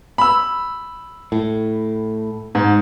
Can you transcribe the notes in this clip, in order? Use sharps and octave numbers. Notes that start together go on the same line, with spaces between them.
B5 E6
A2
G#2